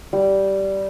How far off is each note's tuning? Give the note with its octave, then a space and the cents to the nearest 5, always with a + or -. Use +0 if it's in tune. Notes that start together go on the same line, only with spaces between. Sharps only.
G3 -10